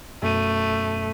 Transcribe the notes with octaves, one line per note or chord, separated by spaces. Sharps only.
F#2 B2 A3 D#7